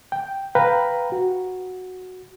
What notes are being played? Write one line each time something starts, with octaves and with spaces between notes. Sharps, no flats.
G5
B4 F5 G5 A#5 B5
F#4